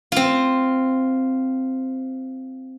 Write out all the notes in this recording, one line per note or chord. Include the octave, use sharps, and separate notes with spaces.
C4 F4